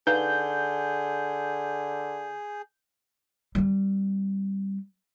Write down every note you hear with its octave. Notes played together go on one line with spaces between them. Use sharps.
D3 D#4 G#4 B4 F5 G6
G3 C4